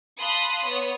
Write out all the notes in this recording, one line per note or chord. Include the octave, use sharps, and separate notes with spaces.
F5 A5 B5 C6 D#6 F#6
B3 C#5 D#6